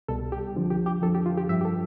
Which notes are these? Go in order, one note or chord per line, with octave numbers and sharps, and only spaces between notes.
C2 B2 G3 A4
G4
F2 D3 F3
G4
G4
F2 D3 F3 A4
G4
F4
G4
G2 F3 E5
G4
A4